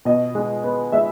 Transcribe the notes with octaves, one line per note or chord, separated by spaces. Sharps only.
B2 D#5
G#3
B3
G#3 E5